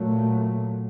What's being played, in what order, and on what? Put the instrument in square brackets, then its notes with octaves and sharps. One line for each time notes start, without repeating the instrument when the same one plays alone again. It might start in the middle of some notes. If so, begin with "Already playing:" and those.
Already playing: [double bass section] A#2 F#3 A3